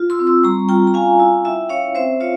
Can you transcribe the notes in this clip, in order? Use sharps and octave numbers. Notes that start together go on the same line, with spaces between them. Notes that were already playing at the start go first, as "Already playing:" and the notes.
Already playing: F4
C6 E6
C4
C6 E6
G3 A#5 C#6
F4 G5 A#5
A#5
C#4 F5 G#5
E4
E4 E5 G5
C#4 C#5 F5
C4 C5 E5
F4 C#5 F5